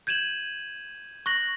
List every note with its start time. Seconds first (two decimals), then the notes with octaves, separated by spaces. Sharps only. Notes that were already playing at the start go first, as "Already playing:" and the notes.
0.07 G6 G#6 D#7 E7 F#7
1.26 C#6 F#6 A#6 F#7